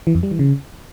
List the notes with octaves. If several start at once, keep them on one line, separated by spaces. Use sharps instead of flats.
E3
F2
G3
E3
C#3